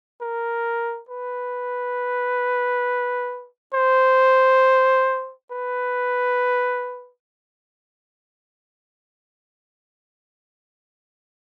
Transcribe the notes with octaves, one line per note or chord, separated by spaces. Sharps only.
A#4
B4
C5
B4